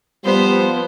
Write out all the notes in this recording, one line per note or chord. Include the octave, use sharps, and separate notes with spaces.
F3 G3 B3 C5